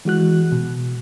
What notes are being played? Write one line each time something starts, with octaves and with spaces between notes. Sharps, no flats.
E3 G#3 F#4 F#6
B2